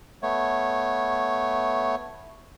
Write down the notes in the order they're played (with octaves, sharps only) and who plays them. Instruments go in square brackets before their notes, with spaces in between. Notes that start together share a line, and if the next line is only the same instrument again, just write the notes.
[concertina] A3 B3 C#5